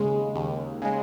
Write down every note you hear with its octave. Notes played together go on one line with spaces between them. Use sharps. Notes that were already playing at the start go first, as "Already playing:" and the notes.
Already playing: D#2 C#3 G#3
D#2
C#3 G#3